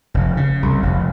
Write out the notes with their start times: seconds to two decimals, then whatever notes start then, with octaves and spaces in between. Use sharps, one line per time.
0.14 F1
0.37 C#3
0.63 C2
0.83 F1